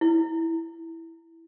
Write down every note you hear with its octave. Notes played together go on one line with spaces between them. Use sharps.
E4